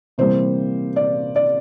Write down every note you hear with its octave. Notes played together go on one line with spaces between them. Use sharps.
C3 E3 G3 A#3 C5
D5
D5